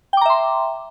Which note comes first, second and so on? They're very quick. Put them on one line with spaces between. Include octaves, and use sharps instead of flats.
G5 D6 A#5 E5 C6